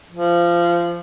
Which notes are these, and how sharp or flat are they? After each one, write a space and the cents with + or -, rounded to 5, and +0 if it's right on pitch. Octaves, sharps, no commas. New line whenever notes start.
F3 -20